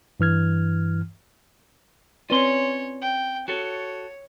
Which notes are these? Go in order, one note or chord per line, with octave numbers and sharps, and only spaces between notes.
G2 E3 F6 G#6
C4 C#4 F4 B4 C#5 D5 C6
G5
F#4 A4 C#5